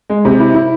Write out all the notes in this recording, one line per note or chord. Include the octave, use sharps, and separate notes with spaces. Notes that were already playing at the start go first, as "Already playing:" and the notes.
G#3
C3
E4
E4